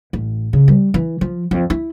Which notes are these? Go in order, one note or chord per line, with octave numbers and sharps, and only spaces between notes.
A1
C#3
G3
E3
F3
F2
E4